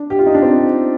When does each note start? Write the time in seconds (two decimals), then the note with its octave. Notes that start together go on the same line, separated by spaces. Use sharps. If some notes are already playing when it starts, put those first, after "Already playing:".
Already playing: D4
0.10 G4
0.19 F4
0.26 D#4
0.34 D4
0.42 C4